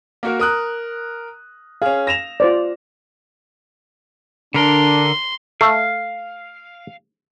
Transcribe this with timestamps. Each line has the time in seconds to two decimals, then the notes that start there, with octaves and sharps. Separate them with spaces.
0.23 A#3 F#4 A#4
0.39 A#4 D#6 F#6
1.82 C#4 G#4 F5
2.07 A#6 E7 F7
2.40 F4 C5 D5
4.54 D3 D4 A#4 C6
5.61 A3 F5